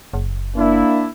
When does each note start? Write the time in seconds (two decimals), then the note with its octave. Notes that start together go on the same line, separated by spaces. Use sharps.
0.13 F#1
0.57 A#3 D4 E4